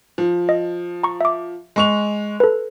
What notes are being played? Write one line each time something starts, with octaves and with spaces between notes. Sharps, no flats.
F3
D#5
A#5 C#6
E5 D6
G#3 C#6 F7
A4 B4